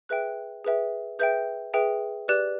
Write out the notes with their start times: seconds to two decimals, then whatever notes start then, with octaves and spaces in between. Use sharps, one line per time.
0.09 G#4 B4 E5 G5 F#6
0.65 G#4 B4 E5 G5
1.19 G#4 B4 E5 G5 G6
1.74 G#4 B4 E5 G5
2.28 G4 B4 D5 F#6